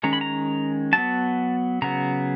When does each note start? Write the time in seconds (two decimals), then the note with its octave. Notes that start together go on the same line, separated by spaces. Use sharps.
0.03 D#3 G#3 C#4 A#5
0.13 B5
0.21 A#5
0.93 F#3 B3 A5
1.82 C#3 F#3 B3 A#5